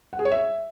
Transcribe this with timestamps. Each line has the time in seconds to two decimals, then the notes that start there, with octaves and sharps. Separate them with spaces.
0.13 F#5
0.19 G#4
0.25 C#5
0.31 E5